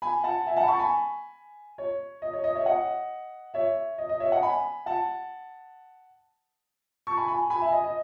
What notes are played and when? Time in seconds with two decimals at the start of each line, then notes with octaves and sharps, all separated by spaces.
0.02 G#5 B5
0.24 F#5 A5
0.46 E5 G#5
0.57 F#5 A5
0.64 B5
0.68 A5 C#6
0.79 G#5 B5
1.78 C#5
2.22 D#5
2.33 C#5
2.44 D#5
2.55 C#5 E5
2.66 D#5 F#5
3.54 C#5 E5
3.98 D#5
4.09 D#5
4.20 C#5 E5
4.31 D#5 F#5
4.42 G#5 B5
4.86 F#5 A5
7.07 A5 C#6
7.17 G#5 B5
7.28 G#5 B5
7.50 G#5 B5
7.62 E5 G#5
7.72 D#5
7.84 D#5